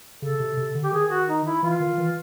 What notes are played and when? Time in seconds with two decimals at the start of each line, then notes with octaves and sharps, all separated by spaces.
0.22 C#3 A4
0.40 C3
0.57 C3
0.75 D3
0.83 G4
0.93 D#3 G#4
1.11 F#4
1.28 D#4
1.46 E4
1.63 E3 F4
1.80 D#3
1.98 E3